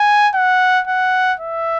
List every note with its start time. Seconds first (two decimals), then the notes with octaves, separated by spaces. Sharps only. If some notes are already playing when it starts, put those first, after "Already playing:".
Already playing: G#5
0.34 F#5
0.87 F#5
1.39 E5